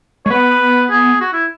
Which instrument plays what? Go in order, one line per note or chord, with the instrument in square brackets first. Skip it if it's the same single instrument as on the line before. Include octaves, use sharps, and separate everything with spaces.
[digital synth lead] G#3 [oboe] C#5
[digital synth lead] B3 [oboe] B4
[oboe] G#4
F#4
E4